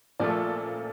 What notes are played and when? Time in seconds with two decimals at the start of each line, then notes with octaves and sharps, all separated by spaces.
0.20 A#2 F3 A3 D5
0.30 A4